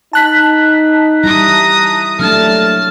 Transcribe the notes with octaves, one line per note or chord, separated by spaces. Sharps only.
D#4 A5 F#6 B6
G3 E4 A#5 D#6
F#3 A3 A#3 D4 A5 F6